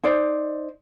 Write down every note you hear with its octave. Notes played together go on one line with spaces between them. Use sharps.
D#4 C5 D5